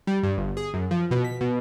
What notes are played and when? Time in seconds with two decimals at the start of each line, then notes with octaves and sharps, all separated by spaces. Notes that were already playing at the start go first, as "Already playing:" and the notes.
0.07 G3
0.23 G2
0.37 G1
0.57 G#4
0.74 F#2
0.91 F3
1.11 B2
1.24 B6
1.41 B2